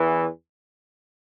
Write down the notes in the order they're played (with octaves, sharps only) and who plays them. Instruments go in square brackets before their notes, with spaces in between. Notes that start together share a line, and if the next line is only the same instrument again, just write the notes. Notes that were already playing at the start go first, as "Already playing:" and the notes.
Already playing: [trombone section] E2 E3